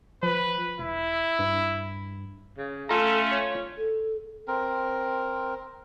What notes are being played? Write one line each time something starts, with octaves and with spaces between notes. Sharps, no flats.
F3 B4
E1 E4
G2
C#3
A3 C#4 F4 A4 A#5
C#5
A4
C4 A#4